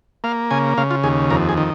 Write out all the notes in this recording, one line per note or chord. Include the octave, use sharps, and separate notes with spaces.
A#3 F5
C#3 G#5
C#3 F5
F4
D#2 G#4
F2 A#4
G#4
D#3